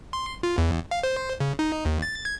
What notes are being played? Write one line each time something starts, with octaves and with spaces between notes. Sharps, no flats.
C6
F4
E2
F5
C5
C#3
D#4
D#2
A6
G#6